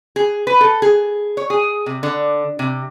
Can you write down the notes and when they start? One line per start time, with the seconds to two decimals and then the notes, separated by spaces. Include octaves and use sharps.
0.16 G#4
0.47 B4
0.61 A4
0.82 G#4
1.37 C#5
1.50 G#4
1.86 C3
2.03 D3
2.59 C3